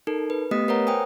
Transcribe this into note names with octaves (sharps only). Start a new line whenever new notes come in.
D#4 A4 A#4
B4
A3 B3 G4 D#5 D#6 B6
A#4 B4 C#5 F#5 A#5
C5 G5 G#5 D#6